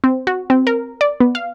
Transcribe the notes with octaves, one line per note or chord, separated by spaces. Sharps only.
C4
F#4
C4
A#4
D5
B3
F5